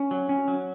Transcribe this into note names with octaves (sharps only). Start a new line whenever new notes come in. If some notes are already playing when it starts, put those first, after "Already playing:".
Already playing: C#4
F#3
C#4
F#3